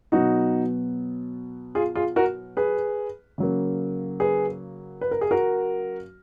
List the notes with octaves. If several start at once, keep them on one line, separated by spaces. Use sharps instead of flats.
B2 F#3 B3 D#4 F#4
F4 G#4
F4 G#4
F#4 A#4
G#4 B4
C#3 F#3 A#3
G#4 B4
B4
A#4
G#4
F#4 A#4